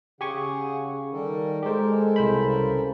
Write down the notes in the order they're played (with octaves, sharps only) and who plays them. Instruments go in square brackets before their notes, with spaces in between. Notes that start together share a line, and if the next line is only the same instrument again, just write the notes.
[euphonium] C#3 [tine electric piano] G4 G#5 C#6 [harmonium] G#4 F#5
[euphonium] D#3 [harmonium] G3 A4 A#4
[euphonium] G#3 [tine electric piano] G4 C5 [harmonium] A4 A#4
[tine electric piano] C2 C5 B5
[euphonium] C#3